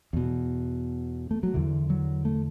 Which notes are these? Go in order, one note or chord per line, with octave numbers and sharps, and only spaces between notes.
E2 B2
A3
F#3
E2 D3 E3
F#3
A3